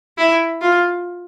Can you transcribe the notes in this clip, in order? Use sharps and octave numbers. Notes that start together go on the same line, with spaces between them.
E4
F4